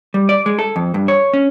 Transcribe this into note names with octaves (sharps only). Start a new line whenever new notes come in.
G3
D5
G#3
A4
F2
G2
C#5
C#4